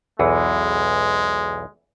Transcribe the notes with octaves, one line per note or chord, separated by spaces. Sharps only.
B1 E2 E3 G#3